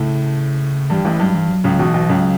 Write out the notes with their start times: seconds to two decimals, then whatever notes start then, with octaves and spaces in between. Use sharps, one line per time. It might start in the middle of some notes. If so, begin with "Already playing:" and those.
Already playing: A2 C#3 A3
0.90 G2 E3 G3
1.04 A1 A2 E3
1.20 G2 F#3
1.35 G2 E3
1.50 F#3
1.64 C#2 C#3
1.78 B1 B2 E3
1.94 B1 B2
2.09 C#2 C#3 F#3